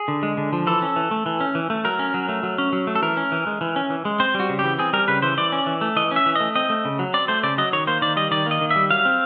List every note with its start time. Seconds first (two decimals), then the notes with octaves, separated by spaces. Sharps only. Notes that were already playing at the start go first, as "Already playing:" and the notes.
Already playing: G#4
0.08 D3
0.23 G#3
0.37 D3
0.53 F3
0.67 E3 A4
0.82 C#4
0.96 E3
1.11 A3
1.26 E3
1.40 C#4
1.55 E3
1.70 A3
1.85 F#3 A#4
1.99 C#4
2.14 F#3
2.29 A3
2.43 F#3
2.58 C#4
2.73 F#3
2.87 A3
2.95 A4
3.02 E3 A#4
3.17 C#4
3.32 E3
3.47 G#3
3.61 E3
3.76 C#4
3.90 E3
4.05 G#3
4.20 C4 C5
4.35 G3
4.40 F#4
4.49 C#3
4.59 G4
4.64 E3
4.79 C4 G#4
4.93 G3 A#4
5.08 C#3 B4
5.22 E3 C5
5.37 E3 D5
5.52 C#4
5.67 E3
5.81 A3
5.96 E3 D#5
6.11 C#4 E5
6.26 E3
6.36 A3 D#5
6.55 C4 D#5
6.70 A3
6.85 C#3
6.99 F#3
7.14 C4 D5
7.28 A3 C5
7.43 C#3 D5
7.58 F#3 D#5
7.73 D#3 C#5
7.87 A#3 C5
8.02 D#3 D5
8.16 G3 D#5
8.31 D#3 D5
8.46 A#3 D#5
8.61 D#3
8.70 E5
8.76 G3
8.90 F#3 F5
9.05 C4